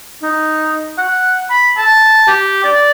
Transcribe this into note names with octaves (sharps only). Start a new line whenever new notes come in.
D#4
F#5
B5
A5
G4
D5